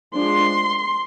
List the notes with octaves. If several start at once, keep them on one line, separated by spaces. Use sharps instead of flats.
F3 G#3 D4 C6